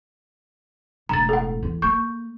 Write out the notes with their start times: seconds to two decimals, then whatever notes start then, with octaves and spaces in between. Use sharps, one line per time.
1.09 E1 A2 A#5 A6
1.29 A4 F#5
1.63 E2
1.82 A#3 C#6 G6